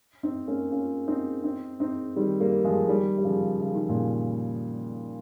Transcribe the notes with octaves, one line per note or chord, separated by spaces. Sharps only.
C4 D#4
A#3 C#4
C#4 F4
C4 D#4
C4 D#4
C4 D#4
D#3 G3
G3 A#3
F3 G#3
D#3 G3
G3
C#3 F3
C#3
D#3
A#2 C#3